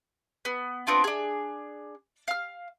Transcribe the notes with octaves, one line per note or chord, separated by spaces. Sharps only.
B3
B3 C4 D4 F4
D4 G#4
F5 F6